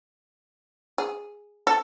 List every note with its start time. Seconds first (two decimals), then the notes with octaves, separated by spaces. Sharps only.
0.98 G#4
1.67 A4